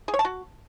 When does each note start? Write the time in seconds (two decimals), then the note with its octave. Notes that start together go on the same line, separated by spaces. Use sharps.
0.08 G#4
0.14 C#5
0.19 A5
0.25 F#4